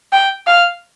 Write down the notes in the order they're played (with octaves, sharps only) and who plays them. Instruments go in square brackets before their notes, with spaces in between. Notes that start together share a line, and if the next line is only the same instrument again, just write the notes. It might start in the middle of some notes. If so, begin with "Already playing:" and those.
[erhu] G5
F5